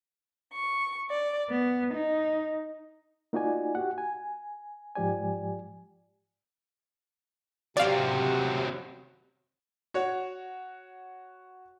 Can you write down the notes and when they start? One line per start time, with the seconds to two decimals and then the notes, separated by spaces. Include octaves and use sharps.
0.55 C#6
1.10 D5
1.49 B3
1.95 D#4
3.33 A#3 D#4 F4 F#4 D5 G#5
3.75 F#4 G4 F#5
3.98 G#5
4.95 G#2 F3 G4 D5 G#5
7.77 C3 F#3 C4 D5 F5
9.94 F#4 C#5 F#5